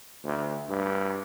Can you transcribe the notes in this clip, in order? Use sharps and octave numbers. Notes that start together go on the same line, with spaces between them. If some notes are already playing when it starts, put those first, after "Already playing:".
D2
G2